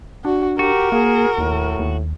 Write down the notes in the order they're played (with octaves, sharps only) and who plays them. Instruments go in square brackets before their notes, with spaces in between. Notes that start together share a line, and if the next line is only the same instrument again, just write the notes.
[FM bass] D4 [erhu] F#4
[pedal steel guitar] F#4 [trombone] G4 [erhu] A#4
[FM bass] A#3 [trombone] G#4
[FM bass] D#2 [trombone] A2
[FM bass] D#2